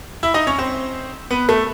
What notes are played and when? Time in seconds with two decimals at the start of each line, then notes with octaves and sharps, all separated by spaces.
0.23 E4 E5
0.34 D#4 D#5
0.47 C#4 C#5
0.58 C4 C5
1.31 B3 B4
1.49 A3 A4